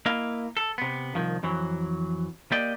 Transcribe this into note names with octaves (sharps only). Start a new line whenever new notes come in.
A#3 E4 D#5 F5
A4
C3 B3
C2 G#2 D#3 F3
F2 E3 F#3
A#3 G4 D5 D#5